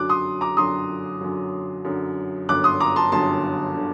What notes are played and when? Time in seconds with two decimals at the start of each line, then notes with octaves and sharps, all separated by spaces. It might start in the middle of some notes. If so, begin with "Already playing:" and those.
Already playing: F#2 D3 F#3 D6 F#6
0.10 C6 D#6
0.41 A#5 D6
0.57 F#2 D3 F#3 C6 D#6
1.21 F#2 D3 F#3
1.85 F#2 D3 F#3
2.49 G1 F#2 D3 D6 F#6
2.64 C6 D#6
2.80 A#5 D6
2.96 A5 C6
3.12 G1 F#2 D3 A5 C6
3.76 D3